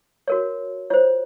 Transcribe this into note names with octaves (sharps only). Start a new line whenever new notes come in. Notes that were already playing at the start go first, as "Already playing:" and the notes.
F#4 A#4 C#5
F4 C5 C#5